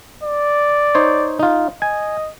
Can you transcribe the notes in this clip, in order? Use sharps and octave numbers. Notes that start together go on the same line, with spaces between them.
D5
D#4 C5 C#5
D#4 F4
D#5 G#5